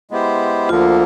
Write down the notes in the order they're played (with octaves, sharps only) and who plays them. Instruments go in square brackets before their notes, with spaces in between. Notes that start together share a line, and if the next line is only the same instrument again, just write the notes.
[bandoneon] G#3 B3 E4 G4 C5
[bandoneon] D2 D3 F3 A#3 [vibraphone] F4